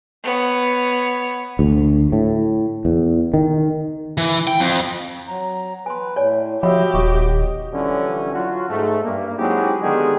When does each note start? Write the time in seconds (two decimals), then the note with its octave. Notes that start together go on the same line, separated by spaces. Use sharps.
0.24 B3 C#5
1.59 D2
2.12 A2
2.85 E2
3.34 D#3
4.18 E3
4.47 G5
4.60 F2
5.28 F#3 A#5
5.86 B4 G#5 C6
6.16 A2 C#5 D5 G#5
6.63 F3 F#4 G4 C#5 D#5 E5 F#5 B5
6.94 D#1 D#5 C#6
7.73 D3 E3 F3 G3 C#4
8.34 F#3 F4 F#4
8.69 G#2 A3
9.04 G2 A#3
9.38 F#3 G#3 C4 D#4 E4 G4
9.82 D3 D#3 G#3 B3 G4 G#4